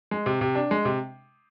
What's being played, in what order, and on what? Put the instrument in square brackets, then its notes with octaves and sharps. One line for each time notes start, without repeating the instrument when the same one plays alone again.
[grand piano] G#3
C3
C3
D4
G#3
C3